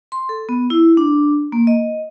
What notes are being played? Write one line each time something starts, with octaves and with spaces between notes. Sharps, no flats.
C6
A4
B3
E4
D4
A#3
D#5